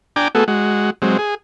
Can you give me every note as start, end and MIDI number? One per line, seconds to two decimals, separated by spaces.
0.16 0.28 62
0.16 0.28 79
0.16 0.28 80
0.16 0.28 82
0.16 0.28 86
0.35 0.44 57
0.35 0.44 59
0.35 0.44 66
0.35 0.44 68
0.35 0.44 69
0.48 0.90 56
0.48 0.90 66
1.02 1.17 54
1.02 1.17 56
1.02 1.17 60
1.18 1.35 68